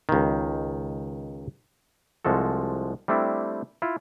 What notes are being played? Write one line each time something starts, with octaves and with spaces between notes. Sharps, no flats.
C#2 D#3
C2 F3 G#3 F#4 A4
G3 A3 C4 D4 E4
E4 F4